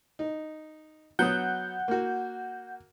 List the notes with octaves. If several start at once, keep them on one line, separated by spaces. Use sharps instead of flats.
D#4
F#3 B3 F#5 D#6 G6
A#3 F#4